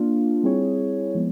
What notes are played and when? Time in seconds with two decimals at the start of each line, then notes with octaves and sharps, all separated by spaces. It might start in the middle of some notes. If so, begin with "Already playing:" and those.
Already playing: A#3 D4 F4
0.43 G3 C4 E4 G#4 C#5
1.15 F3 G#3 B3